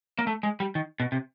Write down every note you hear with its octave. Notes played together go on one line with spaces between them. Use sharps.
A#3
A3
G#3
G3
D#3
B2
C3